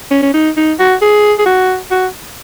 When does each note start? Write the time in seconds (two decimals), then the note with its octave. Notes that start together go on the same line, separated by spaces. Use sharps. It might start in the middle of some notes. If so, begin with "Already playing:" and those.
0.11 C#4
0.23 C#4
0.34 D#4
0.57 D#4
0.79 F#4
1.01 G#4
1.38 G#4
1.46 F#4
1.91 F#4